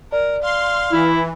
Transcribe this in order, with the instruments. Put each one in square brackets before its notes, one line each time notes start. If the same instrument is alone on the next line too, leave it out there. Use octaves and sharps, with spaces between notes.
[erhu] A#4 [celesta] D5
[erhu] F5 [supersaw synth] C6
[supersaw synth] E3 [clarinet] E4